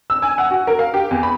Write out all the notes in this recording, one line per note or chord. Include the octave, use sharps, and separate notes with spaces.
E6
G#5
F#5
F#4
A#4
F5
G4
E2
B5